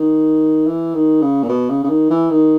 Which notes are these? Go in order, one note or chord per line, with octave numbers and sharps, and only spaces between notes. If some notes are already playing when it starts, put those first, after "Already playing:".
Already playing: D#3
E3
D#3
C#3
A#2
B2
C#3
C#3
D#3
E3
D#3